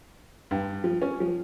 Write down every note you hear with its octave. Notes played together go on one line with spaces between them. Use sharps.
G2
F3
C#4
F3